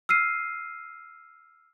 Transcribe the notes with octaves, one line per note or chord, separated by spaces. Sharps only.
E6 F6 C7 D#7